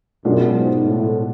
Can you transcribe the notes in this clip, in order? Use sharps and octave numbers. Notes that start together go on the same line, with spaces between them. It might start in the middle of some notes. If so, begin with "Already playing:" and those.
F#2 B2 G#3 D4 F4
G#2
A2